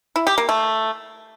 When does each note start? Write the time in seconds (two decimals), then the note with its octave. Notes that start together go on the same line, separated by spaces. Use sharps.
0.16 E4
0.27 G4
0.38 A#3
0.49 A3